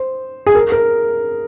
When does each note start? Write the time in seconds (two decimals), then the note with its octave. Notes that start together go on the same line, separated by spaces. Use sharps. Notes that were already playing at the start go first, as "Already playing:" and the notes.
Already playing: C5
0.47 G#4
0.55 A#4
0.72 A#4